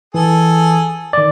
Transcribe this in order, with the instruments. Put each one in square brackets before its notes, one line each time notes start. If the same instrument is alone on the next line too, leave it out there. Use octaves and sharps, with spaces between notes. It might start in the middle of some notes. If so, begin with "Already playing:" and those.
[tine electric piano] E3 [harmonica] G#4 A4
[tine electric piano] D#3 D5